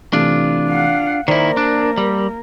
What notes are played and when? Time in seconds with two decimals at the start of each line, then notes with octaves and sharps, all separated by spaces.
0.13 C3 E3 A3 D4 F4
0.70 F5 F#5
1.28 D#3 A#3 E4 A#4 C5 D5
1.57 D4
1.98 G3